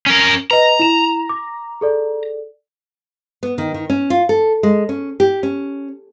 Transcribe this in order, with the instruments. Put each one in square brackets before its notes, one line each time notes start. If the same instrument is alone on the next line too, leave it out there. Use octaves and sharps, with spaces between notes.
[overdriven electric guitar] C#4 A#4
[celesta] B4 D#5 [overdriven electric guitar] A#5
[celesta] E4 E7
D6
G#4 A4 D5
[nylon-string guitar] B3
D#3
D#3
C#4
F4
A4
G#3
C#4
G4
C#4